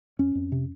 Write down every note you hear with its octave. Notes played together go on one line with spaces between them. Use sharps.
F2 C#4
F2
C3